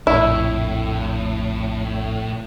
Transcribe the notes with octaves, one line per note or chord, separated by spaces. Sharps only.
A#1 F2 A2 E4